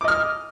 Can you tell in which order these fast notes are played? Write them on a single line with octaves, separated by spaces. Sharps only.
D6 D#5 F6